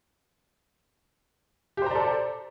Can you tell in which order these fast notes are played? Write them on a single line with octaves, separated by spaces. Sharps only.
G4 C5 A#5 D5 A4